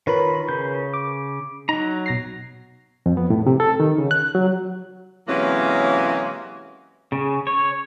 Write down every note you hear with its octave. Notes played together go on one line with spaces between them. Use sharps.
D#3 F4 A#4 B4 C#5 B5
C#3 G6
D6
F#3 D#4 A#5
B2 A#6 C7
F2
B3
A2
C3
A4
D#3
C#3
F#6
F#3
C3 E3 F#3 G#3 A#3 C#4
C#3
C#5